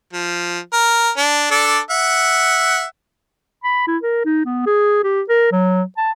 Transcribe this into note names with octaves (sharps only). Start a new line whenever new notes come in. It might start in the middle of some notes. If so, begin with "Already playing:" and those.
F3
A#4
D4
D4 A4 D5
E5 F#5
B5
E4
A#4
D#4
B3
G#4
G4
A#4
F#3
A5